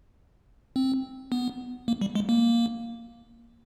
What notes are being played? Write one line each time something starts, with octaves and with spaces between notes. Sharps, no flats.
C4
B3
A#3
G3
G#3
A#3